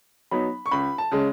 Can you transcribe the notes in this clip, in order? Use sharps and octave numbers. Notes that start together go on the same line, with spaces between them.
F#3 B3 D#4 B5
C#6
C#2 B5
A5
C#3 G#3